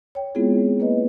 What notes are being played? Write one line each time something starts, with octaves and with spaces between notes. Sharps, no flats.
C#5 G5
G#3 B3 C4 E4 F4 G#4
A#3 B4 D#5